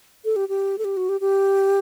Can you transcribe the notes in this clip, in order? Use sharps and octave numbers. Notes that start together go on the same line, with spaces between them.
A4
G4
G4
A4
G4
F#4
G4
G4